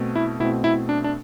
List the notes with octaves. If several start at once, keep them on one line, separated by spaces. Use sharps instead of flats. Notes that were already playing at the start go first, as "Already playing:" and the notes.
Already playing: B2 A3 C4
E4
B2 A3 C4 E4
E4
D4
D4